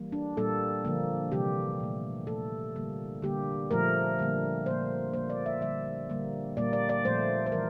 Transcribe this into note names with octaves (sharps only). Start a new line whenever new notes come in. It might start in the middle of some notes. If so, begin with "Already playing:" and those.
Already playing: E3 G3 A#3
D4
A#2 G3 A#3 A4
D3 F3 A#3
C3 E3 G3 A#3 G4
A#2 A3
A#2 A3 A4
D3 G3 A#3
D3 G3 A#3 G4
A#2 F3 A3 A#4
D3 G3 A#3
A#2 F3 A#3 C5
A#2 F3 A#3 C5
D5
E5
D3 G3 A#3 E5
D3 G3 A#3
A#2 G3 A#3 D5
D5
D5
A#2 F3 A3 C5
C5
E3 G3 A#4